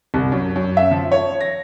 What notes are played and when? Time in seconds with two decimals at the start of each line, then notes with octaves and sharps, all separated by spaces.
0.14 C2
0.32 F#2
0.56 F#2
0.77 E5
0.91 F3
1.12 C#5
1.41 A#6